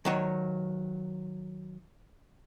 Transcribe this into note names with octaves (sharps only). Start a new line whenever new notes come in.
D#3 F#3 C#5